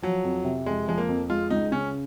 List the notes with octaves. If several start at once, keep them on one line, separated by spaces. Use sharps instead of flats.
F3 F#3
F2
C3
F2 G#3
F3 G#3
A#3
F2
G#3 F4
C#2 D#4
C#3 C#4